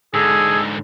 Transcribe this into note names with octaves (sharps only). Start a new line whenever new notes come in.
G#2 D3 G#4 A4